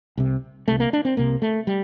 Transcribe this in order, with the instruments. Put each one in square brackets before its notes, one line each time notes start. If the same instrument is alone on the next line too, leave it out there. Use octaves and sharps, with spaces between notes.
[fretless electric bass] C2 C3
C2 C3 A3
A#3
D4
C4
C2 C3 A#3
A3
G3